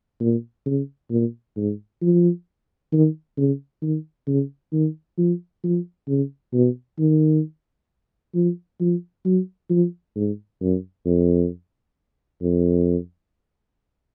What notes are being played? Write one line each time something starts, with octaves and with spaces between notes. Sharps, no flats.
A#2
C#3
A#2
G#2
F3
D#3
C#3
D#3
C#3
D#3
F3
F3
C#3
B2
D#3
F3
F3
F#3
F3
G#2
F#2
F2
F2